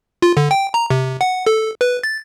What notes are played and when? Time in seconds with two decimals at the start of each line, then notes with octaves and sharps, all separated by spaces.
0.22 F4
0.37 D3
0.51 G5
0.74 A#5
0.90 C3
1.21 F#5
1.46 A4
1.81 B4
2.03 A6